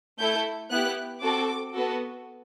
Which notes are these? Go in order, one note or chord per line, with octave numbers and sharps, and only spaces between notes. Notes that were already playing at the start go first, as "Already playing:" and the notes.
A3 E4 A4 G6
B3 E4 G4 F#6
C4 F#4 A4 D6
B3 F#4 A4